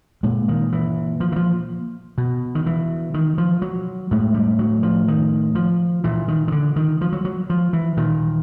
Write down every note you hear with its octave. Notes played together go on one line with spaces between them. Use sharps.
A#2 G#3
D#3
E3
F3
E3
F3
B2
D#3
E3
D#3
F3
F#3
A2 G#3
G3
F#3
F3
D#3
F3
A#2 E3
D#3
D#3
D3
D#3
F3
F#3
F#3
F3
E3
A#2 D#3